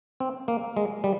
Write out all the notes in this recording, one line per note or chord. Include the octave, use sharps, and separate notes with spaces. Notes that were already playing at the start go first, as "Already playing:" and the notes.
C4
A#3
G#3
G3